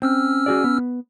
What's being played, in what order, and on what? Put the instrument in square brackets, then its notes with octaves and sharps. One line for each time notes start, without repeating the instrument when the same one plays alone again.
[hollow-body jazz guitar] C4 [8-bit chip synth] C#4 E6 F6
[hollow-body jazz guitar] F#4 G#4 D5
B3